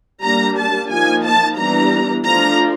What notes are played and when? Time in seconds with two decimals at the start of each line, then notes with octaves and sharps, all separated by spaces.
0.23 G3 A#3 D4 A#5
0.58 A5
0.91 F3 A#3 D#4 G#5
1.25 A5
1.58 E3 G3 B3 D4 A#5
2.25 F3 A3 D4 F4 A#5